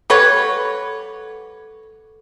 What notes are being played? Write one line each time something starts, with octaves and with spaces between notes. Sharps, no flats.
G3 A4 B4 C#5 F#5 D6